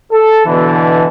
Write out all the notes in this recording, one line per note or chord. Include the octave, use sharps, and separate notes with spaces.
A4
B2 D3 E3